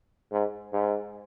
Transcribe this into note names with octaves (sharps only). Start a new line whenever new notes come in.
G#2
G#2